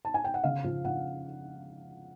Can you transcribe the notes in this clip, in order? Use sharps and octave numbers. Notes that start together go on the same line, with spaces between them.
A5
G#5
G5
F#5
C#3 F5
F3
F3 F#5